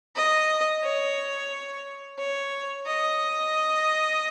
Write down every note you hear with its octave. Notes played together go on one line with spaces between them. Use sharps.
D#5
C#5
C#5
D#5